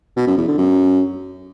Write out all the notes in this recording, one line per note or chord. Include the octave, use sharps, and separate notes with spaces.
B2
F#2
E2
D3
F#2